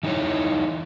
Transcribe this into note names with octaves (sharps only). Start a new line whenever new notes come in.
E3 D#4 E4 C#5